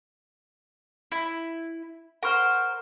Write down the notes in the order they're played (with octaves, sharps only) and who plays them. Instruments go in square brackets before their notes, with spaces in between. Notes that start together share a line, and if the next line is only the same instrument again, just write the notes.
[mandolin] E4
[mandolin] A#4 C5 [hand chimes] F#5 C#6 F6